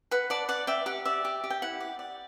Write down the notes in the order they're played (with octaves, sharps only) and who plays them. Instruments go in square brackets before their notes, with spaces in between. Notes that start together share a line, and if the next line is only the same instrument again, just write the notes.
[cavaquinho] B4 F#5
D5 F#5 A5
D5 F#5
D5 E5 G5
G4 F#5
D5 E5
G4
G4
G5
E4 F#5
D5
D5